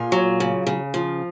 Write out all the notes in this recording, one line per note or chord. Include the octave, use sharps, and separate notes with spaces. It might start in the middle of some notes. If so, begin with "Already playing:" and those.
Already playing: A#2 F4 G#4
F#3
C#3
C#3
F3